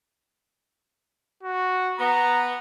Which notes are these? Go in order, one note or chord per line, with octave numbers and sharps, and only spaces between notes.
F#4
B3 A#5